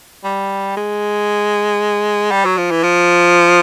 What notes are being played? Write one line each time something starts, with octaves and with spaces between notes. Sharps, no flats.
G3
G#3
G3
F#3
F3
E3
F3